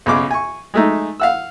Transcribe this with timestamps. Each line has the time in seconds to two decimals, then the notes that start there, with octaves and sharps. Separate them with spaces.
0.06 B1 C#3 D6
0.31 G#5 C#6
0.74 G#3 A3 D#4
1.20 F5 F#5 E6